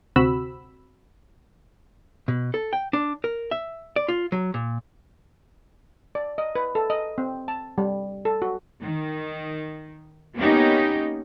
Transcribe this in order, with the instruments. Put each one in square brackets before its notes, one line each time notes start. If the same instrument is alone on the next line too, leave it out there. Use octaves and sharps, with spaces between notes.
[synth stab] D2 C3 C4 F#4 B5 E6
[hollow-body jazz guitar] B2
A4
G5
D4
A#4
E5
D5
F4
F#3
A#2
[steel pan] D5
D#5
B4
A4
D#5
C4
A5
G3
A4
F#4
[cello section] D#3
A#3 B3 C#4 D#4 G4